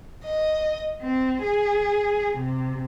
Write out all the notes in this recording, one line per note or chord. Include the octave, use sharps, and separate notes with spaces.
D#5
C4
G#4
C3